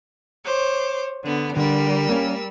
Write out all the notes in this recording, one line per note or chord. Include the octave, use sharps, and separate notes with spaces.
C5 C#5 D6
D3 B3
D3 G3 D4 A#4 E6
A#3 C#4